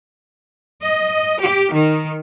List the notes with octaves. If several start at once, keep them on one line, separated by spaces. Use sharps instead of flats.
D#5
G4
D#3